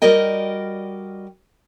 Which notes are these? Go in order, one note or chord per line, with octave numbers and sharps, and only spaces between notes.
G3 F#4 A#4 D5 D#5 G5